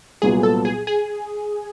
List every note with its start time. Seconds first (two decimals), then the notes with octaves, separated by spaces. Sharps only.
0.22 C2 A#2 F#3 B3 G#4
0.43 A4
0.65 G#4
0.87 G#4